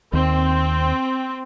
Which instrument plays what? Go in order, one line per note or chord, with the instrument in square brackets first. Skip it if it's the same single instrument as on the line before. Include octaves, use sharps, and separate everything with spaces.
[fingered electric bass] D#2 [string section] C4